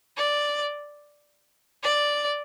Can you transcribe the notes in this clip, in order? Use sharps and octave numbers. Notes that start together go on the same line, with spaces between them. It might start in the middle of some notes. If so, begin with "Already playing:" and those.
D5
D5